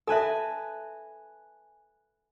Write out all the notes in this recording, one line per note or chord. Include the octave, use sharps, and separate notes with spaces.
A4 B4 E5 G#5 A5